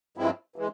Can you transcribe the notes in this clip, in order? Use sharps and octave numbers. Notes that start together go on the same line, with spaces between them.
G2 F3 G#3 C4 E4
E3 G#3